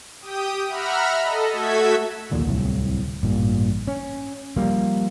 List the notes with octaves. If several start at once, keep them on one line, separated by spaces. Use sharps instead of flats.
G4 G5 D#6
E5 F#5 A#5 B5 F6
A4 D#5
A3 F#4 A4 E5 G#6 B6
A#1 D#2 A#2 D3
D1 C2 A2
A1 G2 A#2
C#4
F3 G3 A#3